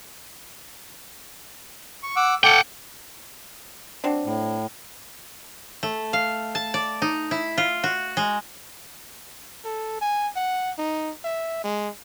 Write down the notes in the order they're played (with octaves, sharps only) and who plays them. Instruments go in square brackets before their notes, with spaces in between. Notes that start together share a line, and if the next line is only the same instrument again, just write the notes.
[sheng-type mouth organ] C#6
F#5 D6 E6
[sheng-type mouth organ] A4 D6 [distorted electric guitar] F#5 G5
[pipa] F#3 C4 D4
[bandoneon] A2
[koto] A3
F5
A5
D5
D#4
E4
F4
F#4
G#3
[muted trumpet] A4
G#5
F#5
D#4
E5
G#3